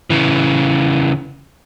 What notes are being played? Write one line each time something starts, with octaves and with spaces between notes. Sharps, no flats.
C#3 E3